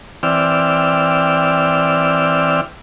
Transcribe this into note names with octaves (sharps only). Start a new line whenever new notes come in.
E3 C4 D5 G5 E6 F6